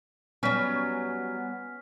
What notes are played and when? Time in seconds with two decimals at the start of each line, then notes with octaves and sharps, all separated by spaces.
0.43 F#3 G3 B3 C#4 G#5 F6 B6